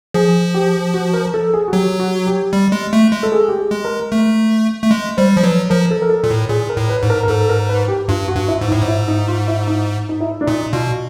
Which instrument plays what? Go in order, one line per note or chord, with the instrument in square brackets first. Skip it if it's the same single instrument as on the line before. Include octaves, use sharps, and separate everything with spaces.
[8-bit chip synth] F3 [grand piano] G#4
[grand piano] G4
F#4
A#4
A4
G#4
F#4
[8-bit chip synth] F#3 [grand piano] G4
[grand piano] F#4
G4
[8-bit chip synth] G3
G#3
A3
G#3
[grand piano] A4
G#4
G4
G#4
[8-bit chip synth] G#3
[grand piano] A#4
[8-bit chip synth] A3
A3
G#3
[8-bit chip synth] G3 [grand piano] C5
[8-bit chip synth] F3
[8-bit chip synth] F#3 [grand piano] B4
[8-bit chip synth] F3 [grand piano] A#4
[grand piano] A4
A#4
A4
[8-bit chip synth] A#2
A2
[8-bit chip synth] A#2 [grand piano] G#4
[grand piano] A#4
[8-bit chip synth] A2
[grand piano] B4
[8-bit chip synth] G#2
[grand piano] A#4
A#4
[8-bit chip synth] G#2 [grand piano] A4
[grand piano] A#4
B4
G4
[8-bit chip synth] G2 [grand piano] F4
[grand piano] F#4
[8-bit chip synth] G2
[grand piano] E4
[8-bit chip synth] G#2
[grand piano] D#4
[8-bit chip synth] A2
G#2
[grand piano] E4
D#4
F4
E4
D#4
D#4
E4
D4
[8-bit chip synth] A#2 [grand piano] D#4
[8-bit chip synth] B2 [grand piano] F4